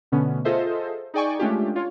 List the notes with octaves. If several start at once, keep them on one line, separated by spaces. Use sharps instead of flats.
B2 D3 A3 B3 C#4
F4 G#4 A4 C5 D#5 E5
D#4 G#4 D5 G5 G#5 C#6
G#3 A3 C#4 D4 F4 G4
F4 C#5